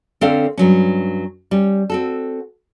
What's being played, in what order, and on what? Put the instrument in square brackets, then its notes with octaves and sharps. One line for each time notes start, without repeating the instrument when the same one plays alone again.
[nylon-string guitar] D3 C4 C#4 A4 D5 F5
G2 F#3 C#4
G3 C#4
C4 F#4 A4